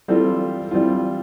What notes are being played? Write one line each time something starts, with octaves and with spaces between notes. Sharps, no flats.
E3 G3 C4 F4 A4
E3 G3 C4 F4